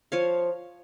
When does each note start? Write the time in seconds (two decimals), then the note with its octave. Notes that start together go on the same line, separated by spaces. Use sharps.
0.12 F3 C#5 F5